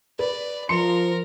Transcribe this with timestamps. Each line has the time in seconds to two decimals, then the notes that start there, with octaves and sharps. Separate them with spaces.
0.19 B4 D5
0.69 F3 A#4 C6 C#7